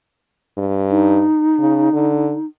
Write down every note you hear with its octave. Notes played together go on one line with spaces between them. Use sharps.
G2
D#4
C#3
D3